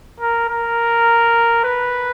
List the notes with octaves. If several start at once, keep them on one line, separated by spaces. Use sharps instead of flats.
A#4
A#4
B4